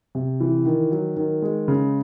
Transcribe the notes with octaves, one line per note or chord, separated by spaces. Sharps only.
C3
E3
D#3
F#3
D#3
G#3
C#3